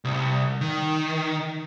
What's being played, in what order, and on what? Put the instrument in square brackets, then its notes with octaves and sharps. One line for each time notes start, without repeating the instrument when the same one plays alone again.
[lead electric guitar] C2
D#3